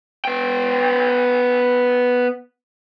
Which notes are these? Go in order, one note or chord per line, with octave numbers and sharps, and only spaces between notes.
B3 G5